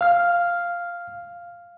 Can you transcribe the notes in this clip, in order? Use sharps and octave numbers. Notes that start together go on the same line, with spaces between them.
F5 F6